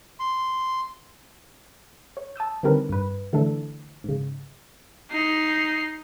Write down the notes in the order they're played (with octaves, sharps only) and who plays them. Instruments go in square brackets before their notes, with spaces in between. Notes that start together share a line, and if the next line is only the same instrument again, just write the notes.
[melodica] C6
[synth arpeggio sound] C#5
A5 D#6 E6 G6
D3 D#3 G3 C4 A#4 B4
G2 B4
D3 E3 A3 D4 A4
G#2 C#3
[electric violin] D#4 C7